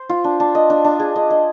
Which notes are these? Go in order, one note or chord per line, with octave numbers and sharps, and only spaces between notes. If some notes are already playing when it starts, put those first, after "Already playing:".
Already playing: C5
F4
D4
D4
D#5
D4
D4
G#4
D#5
D#5